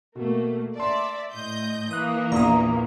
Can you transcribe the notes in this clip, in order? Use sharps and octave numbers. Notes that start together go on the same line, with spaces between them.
B2 A3 A#3
D5 E5 A5 C6
A2 D#5 G6
E3 A#3 D#6 F#6
A#1 E2 A#2 A#5 D#6